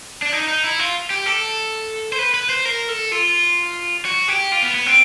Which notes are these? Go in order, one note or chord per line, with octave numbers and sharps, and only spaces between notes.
D4
D#4
D#4
E4
F4
G4
A4
C5
B4
B4
C5
A#4
A4
F4
F#4
G4
F4
B3
B3
C4